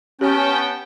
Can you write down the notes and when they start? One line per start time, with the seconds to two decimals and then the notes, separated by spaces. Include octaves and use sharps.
0.21 B3 C#4 G4 G5 A5